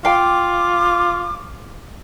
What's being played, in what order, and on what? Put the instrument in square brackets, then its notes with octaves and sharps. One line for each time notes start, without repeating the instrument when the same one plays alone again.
[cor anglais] F4 [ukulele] F5 G5 [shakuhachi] D6